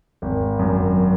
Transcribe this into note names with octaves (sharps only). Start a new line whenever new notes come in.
G#1
F#2